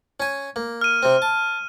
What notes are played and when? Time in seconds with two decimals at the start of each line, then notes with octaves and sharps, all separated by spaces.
0.20 C#4 G#5
0.56 A#3
0.81 F6 D#7
1.03 C3 C4
1.22 A5